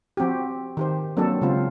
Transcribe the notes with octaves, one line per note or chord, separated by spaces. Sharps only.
F3 C4 F#4 G4
D#3 G4 C5
F#3 A#3 C4 D4 A4
C#3 G#3 C4 F4